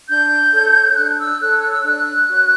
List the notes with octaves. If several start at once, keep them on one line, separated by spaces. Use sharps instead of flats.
D4 G6
A4 C#5
D4 F#6
E6
A4 C#5 F#6
F#6
E6
D4 F#6
F#4 C#5